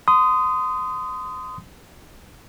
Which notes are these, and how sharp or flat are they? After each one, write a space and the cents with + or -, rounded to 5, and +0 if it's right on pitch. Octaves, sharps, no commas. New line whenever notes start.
C6 -30 D#6 +0